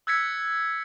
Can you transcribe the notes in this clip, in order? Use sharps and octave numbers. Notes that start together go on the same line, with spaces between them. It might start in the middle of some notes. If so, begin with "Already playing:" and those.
E6 F#6 G#6 A6 B6 C#7